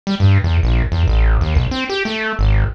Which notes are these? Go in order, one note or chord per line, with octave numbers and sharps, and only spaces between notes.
G3
G2
E2
A#1
E2
A1
D#2
B1
C4
G4
A3
G#1